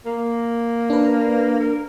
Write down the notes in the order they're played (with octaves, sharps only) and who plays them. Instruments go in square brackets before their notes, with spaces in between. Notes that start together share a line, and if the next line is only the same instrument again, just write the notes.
[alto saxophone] A#3
[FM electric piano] D4 B4
[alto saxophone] A#4